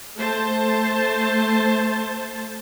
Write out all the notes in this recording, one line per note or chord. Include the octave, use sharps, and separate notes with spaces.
A3 C5 A5